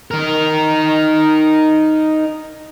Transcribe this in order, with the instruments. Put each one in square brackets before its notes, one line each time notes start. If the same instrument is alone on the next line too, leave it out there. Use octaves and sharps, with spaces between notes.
[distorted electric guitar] D#4 A#4